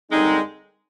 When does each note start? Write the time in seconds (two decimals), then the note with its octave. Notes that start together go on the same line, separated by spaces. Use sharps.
0.11 D#2 D3 G3 G#3 C4 D#4